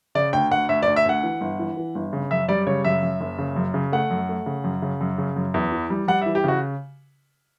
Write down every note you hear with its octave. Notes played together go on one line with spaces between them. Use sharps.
C#3 D5
D2 G5
D2 F#5
D2 E5
D5
D2
E5
D2 F#5
E3
G1
E3
E3
G1
C#3
F#2 E5
G3 D5
C#3 C#5
F#2 E5
F#2
F#1
C#3
F#2
C#3
A3 F#5
F#2
A3
C#3
F#2
C#3
F#2
C#3
F#2
E2
E3
G3
G3 F#5
E5
E3
G4
C#3 F#4